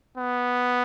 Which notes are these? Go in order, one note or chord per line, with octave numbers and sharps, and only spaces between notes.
B3